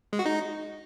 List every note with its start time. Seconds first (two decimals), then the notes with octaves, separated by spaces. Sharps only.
0.13 G#3
0.19 F#4
0.26 D#4